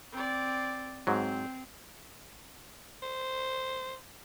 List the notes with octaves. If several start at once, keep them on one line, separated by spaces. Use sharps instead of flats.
C4 D5
G#2 F#3 C4
C5